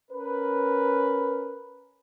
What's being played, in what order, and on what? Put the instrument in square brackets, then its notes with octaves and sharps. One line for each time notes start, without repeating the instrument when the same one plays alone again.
[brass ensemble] C#4 A#4 B4